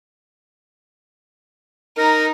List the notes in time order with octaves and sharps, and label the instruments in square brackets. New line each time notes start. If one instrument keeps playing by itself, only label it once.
[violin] D#4 [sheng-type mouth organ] A#4